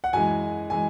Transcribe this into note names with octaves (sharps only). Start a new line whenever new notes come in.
F#5
F#2 E3 G#3 G#5
E3 G#3 G#5